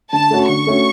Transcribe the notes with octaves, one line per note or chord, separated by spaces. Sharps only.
D3 A5
A3 C#4 F#4
D3 C#6
A3 C#4 F#4